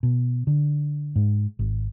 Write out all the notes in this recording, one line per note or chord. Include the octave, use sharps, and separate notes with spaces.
B2
D3
G#2
G#1